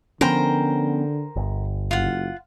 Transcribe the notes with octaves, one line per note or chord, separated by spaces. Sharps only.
D3 F3 B3 C#4 A#4 C5 G5
G1
F#1 F4 F#5